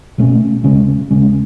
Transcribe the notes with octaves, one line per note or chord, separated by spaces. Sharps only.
B2 A3 C#4
D#2 C#3 G#3 C#4
D#2 C#3 G#3 C#4